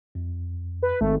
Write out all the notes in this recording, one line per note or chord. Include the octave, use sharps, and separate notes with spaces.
F2
B4
G#1 A3